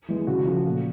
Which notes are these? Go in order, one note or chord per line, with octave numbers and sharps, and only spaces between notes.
E3 G#3 B3
C#3 F#4
F3 A3
A#2